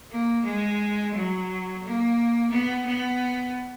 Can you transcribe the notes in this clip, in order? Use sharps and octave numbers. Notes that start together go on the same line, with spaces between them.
A#3
G#3
F#3
A#3
B3
B3